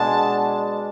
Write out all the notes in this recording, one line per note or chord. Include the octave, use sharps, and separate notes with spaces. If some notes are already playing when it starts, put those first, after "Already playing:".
Already playing: B2 G#3 D4 A5